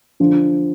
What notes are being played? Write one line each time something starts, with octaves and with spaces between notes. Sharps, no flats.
D3 F3